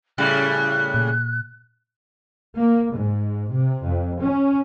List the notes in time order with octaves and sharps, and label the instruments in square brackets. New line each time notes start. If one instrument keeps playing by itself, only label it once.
[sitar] A2 C#3 G3 [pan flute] F#6
[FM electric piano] A#2
[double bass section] A#3
G#2
C3
F2
C#4